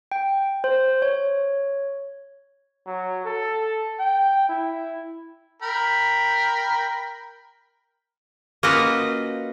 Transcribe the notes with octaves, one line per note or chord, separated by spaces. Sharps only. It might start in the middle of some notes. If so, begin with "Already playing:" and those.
G5
C5
C#5
F#3
A4
G5
E4
A#4 G5 B5
A#3 C#4 F4 F#4 B4 D#5